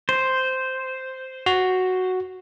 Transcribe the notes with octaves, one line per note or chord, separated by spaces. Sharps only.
C5
F#4